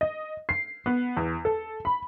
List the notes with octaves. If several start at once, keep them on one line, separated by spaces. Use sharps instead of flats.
D#5
C7
B3
E2
A4
B5